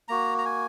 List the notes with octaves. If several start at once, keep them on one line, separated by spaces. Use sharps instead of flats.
A#3 F#4 A#5
A#5
G#5